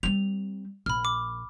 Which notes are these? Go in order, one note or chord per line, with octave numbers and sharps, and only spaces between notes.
G3 C4 F7
A#1 B5 F6
D6